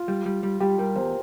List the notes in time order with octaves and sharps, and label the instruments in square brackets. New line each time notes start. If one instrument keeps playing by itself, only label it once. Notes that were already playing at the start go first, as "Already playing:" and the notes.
Already playing: [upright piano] F4
[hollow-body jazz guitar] G3
G3
G3
[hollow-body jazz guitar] G3 [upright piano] G4
[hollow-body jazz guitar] G3 [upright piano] A#4
[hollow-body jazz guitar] E2 [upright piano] C5